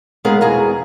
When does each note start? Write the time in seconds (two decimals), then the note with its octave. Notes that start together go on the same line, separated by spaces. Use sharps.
0.25 G#3 B3 G#4 A#4 F5
0.41 E2 B2 G#4 F5 A#5